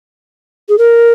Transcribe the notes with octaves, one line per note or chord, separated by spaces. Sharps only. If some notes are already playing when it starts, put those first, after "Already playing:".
G#4
A#4